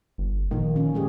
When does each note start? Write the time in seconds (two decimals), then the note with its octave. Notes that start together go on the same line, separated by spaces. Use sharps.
0.18 G1
0.51 A#2 D#3 F3 A#3
0.76 C#4
0.94 G#3 G4 G#4